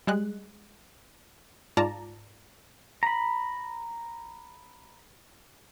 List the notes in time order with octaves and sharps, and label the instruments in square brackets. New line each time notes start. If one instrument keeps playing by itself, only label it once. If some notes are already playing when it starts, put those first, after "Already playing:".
[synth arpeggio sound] G3 G#3 F#6
G#2 F4 D5 A5 A#5
[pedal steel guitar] A#5 B5